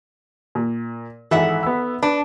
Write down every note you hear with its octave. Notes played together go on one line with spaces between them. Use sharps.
A#2
G#1 E3 A4 E5 F#5
B3 E6
D4 B4